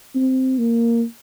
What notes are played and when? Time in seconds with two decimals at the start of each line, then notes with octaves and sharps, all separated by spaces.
0.15 C4
0.58 A#3